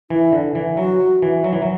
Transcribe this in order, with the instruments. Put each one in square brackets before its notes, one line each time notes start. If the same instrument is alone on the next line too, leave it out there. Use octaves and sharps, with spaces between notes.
[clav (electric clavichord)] E3 [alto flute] E4
[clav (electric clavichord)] D3
E3
[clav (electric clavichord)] F#3 [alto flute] F#4
[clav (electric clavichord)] E3
F#3
E3
F#3